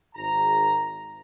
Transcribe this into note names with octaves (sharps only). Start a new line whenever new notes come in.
G#1 A#5